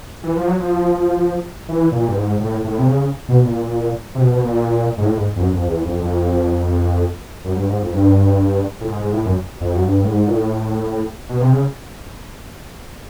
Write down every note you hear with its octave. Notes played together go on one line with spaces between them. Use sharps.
E3
F3
F#3
F3
E3
A#2
G2
G#2
A2
A2
C3
C#3
B2
A#2
C3
B2
B2
A#2
G#2
A2
G#2
F2
F#2
F2
E2
F2
F2
F#2
G2
G#2
F2
G2
A2
G#2
G#2
A2
F#2
F2
F#2
G2
A2
G#2
A#2
A2
B2
C3
C#3